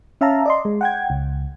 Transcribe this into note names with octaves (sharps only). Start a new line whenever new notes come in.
C#4 E5 F5 A5 A#5
D5 D#5 C6
G#3
F#5 G5 G#6
C#2